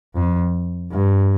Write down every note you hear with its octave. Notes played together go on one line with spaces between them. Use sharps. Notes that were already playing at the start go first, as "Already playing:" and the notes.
F2
G2